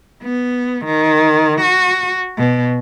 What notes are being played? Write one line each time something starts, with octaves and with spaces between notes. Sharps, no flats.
B3
D#3
F#4
B2